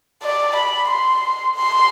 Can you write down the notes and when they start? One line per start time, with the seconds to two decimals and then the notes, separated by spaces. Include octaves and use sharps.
0.23 D5
0.56 B5
0.89 C6
1.55 C6